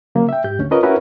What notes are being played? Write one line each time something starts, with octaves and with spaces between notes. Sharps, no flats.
C#3 F#3 A#3
E5 G5
G#2 G4 G6
D2 C#4
C#4 F4 A#4 B4 D#5
C#4 E4 F#4 A#4 B4